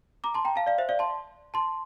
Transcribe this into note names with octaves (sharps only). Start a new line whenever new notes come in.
A#5 D6
A5 C6
G5 A#5
F5 A5
D5 F5
C5 E5
D5 F5
A5 C6
A5 C6